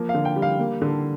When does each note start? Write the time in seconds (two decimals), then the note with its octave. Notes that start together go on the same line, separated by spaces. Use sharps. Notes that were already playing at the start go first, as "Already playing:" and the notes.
Already playing: F3 A#3
0.09 F5
0.14 D3
0.25 G5
0.36 G3
0.42 F5
0.59 A#3
0.82 D3